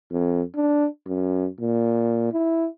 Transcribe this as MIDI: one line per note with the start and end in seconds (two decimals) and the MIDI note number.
0.12 0.42 41
0.55 0.87 62
1.06 1.46 42
1.60 2.29 46
2.33 2.67 64